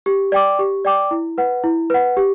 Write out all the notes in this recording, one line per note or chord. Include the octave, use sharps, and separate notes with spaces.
G4
D5 G5 D6
G4
D5 G5 D6
E4
B4 F#5
E4
B4 F#5
G4